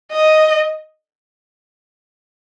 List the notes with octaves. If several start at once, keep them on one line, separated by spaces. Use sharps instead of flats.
D#5